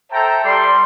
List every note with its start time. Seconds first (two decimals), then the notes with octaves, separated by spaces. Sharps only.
0.12 A4 C5 E5 G5 A5 A#5
0.44 G3 D5 C6